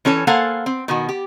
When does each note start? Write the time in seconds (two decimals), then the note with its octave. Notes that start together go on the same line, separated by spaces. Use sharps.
0.05 E3 C#4 A4 C#5
0.27 A#3 A4 C5 F5 F#5 G#5
0.66 C4
0.88 B2 D#3 F#4
1.09 G4